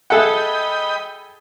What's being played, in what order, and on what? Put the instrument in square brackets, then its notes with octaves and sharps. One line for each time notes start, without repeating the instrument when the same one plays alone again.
[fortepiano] G#4 A4 F#5 [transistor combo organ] D#5 G5 B5